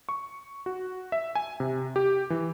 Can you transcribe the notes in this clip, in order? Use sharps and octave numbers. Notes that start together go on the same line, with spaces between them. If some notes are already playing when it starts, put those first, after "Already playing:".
C#6
F#4
E5
G#5
C3
G4
E3